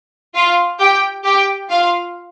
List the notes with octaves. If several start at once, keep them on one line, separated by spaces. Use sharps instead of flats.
F4 F5
G4 G5
G4 G5
F4 F5